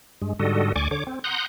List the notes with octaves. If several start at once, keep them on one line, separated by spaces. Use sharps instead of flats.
G2 G#3
G#2 D3 G3 F#4 A4 D#5
D2 D5 G#5 C#6 D6
D3 C#5 D6
C4
F#5 A#5 C6 D#6 F#6 G6